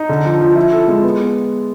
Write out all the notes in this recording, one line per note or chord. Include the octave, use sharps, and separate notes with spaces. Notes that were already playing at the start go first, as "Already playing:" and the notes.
Already playing: D#4
D3
F3
F3
E4
A4
G#3
B3